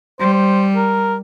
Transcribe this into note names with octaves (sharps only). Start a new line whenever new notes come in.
G3 C5
C5
A#4